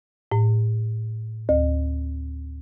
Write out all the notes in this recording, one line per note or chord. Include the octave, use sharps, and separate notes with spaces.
A2
D2